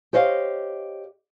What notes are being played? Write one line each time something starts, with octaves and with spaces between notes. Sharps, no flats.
G4 C5 C#5 D#5 F5